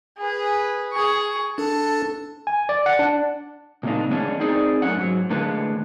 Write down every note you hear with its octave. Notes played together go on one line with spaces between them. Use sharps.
G#4 B4
G#4 C#6
D4 A4 A5
G#5
D5
F#5
D4
A#2 C#3 A#3 C4 D4 D#4
E3 G#3 B3 C#4 D4
C4 D#4 G#4 D5
F#2 A3 C#4 F#5
G#2 F#3
A2 D3 E3 G#3 A#3 B4